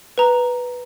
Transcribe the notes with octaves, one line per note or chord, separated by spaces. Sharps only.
B4 A#5